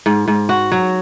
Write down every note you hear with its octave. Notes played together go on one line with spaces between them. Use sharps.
G#2
G#2
F#4
F#3